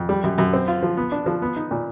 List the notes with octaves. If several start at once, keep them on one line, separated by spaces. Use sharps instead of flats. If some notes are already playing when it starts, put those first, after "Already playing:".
Already playing: F2
G3
F#2
F#2
C4
F4
F3
B3
D4
F3
B3
D#4
A#2